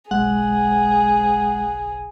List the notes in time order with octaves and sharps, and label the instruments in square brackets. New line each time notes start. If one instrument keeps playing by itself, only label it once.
[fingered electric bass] F#1 B1 [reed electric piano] G#3 [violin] G#4 [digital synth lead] F#5